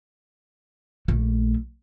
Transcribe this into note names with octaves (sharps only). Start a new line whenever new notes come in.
A#1 A3